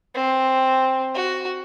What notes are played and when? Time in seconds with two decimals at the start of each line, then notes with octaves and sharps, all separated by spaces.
0.15 C4
1.15 F#4